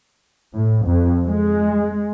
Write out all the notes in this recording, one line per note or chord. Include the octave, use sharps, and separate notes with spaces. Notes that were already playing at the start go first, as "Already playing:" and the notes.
A2
F2
G#3